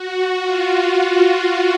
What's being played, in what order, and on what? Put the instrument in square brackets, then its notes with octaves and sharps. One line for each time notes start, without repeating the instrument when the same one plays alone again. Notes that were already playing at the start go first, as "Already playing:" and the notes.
Already playing: [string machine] F#4
F4